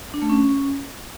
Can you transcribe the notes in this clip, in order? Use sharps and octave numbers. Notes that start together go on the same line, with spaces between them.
D4
A3
C#4